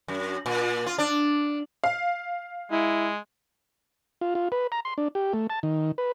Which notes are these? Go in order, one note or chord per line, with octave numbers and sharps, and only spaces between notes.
F#2
A#2
F4
D4
F5
G#3 E4
F4
F4
B4
A#5
C6
D4
G4
A3
A5
D#3
B4